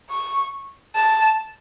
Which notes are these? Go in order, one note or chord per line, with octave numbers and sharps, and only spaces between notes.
C#6
A5